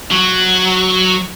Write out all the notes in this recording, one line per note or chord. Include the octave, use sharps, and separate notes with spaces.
F#3